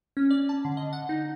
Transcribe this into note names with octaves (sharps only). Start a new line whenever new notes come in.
C#4
D5
A5
D3
D#5
F#5
D#4